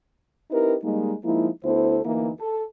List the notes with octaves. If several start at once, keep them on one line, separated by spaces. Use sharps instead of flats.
C4 D#4 E4 G4 A#4 B4
G3 G#3 A#3 D#4
F3 G#3 A#3 D#4 E4
D2 B3 E4 A4 C5
D2 E3 A#3 D#4 E4
A4